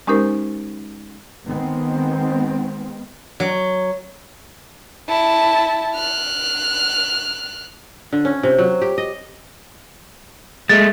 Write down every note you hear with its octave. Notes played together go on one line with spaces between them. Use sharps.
G#3 C#4 D#4 G4 A#4 C5
D#3 G#3 B3 C4
F#3
E4 A5
F6 F#6
D3
C#4
C3
F#3
G4
D#5
G#3 A3 A6